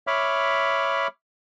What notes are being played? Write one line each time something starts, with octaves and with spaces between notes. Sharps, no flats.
C#5 E5 B5 D6 F6